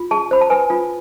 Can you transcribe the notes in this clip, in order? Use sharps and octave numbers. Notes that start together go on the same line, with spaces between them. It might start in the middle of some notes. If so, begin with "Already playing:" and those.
Already playing: F4
G#4 A5
C5 B5
A5
B4 G#5
F4